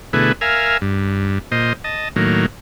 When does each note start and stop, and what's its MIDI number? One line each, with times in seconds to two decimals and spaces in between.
0.13 0.32 47
0.13 0.32 50
0.13 0.32 57
0.13 0.32 64
0.13 0.32 68
0.13 0.32 71
0.41 0.77 70
0.41 0.77 76
0.41 0.77 77
0.41 0.77 80
0.82 1.39 43
1.52 1.73 46
1.52 1.73 72
1.52 1.73 75
1.84 2.09 75
1.84 2.09 81
2.16 2.46 45
2.16 2.46 51
2.16 2.46 54
2.16 2.46 58